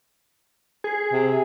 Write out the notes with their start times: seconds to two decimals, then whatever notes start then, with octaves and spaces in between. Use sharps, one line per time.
0.84 G#4
1.12 C3